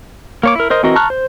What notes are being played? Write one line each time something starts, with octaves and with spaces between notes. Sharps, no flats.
A#3 C#5 D6
E4 A#4
A#4 C5 D#5
E3 C4 F#4 A#4 D#5
A5 A#5 C#6 F6 F#6
C5